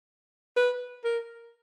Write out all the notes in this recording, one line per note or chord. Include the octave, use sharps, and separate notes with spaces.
B4
A#4